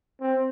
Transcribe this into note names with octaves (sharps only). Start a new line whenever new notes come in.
C4